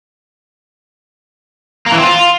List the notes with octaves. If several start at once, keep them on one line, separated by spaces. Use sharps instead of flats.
A#3
E3
C4
F4